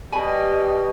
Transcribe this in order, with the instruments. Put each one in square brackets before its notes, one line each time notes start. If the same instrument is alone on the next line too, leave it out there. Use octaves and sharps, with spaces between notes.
[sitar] B2 [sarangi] G3 [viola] G4 D#5 [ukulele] G#5 B5